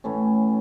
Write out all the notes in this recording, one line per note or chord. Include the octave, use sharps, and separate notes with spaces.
A2 E3 A3 C#4